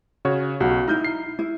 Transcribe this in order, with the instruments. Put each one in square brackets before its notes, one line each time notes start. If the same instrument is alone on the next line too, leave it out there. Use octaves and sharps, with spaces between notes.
[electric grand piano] C#3 F#4 C#5
[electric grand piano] B1 [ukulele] F#4
[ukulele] D#4 E4 [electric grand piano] A#5 F6 G6
[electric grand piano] C7
[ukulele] E4